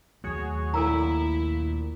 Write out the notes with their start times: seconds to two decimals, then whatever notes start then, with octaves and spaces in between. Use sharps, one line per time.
0.24 D#2 F#3 A3 F#4 G#4 C#5
0.74 A#1 A#2 E4 A4 A#4 A#5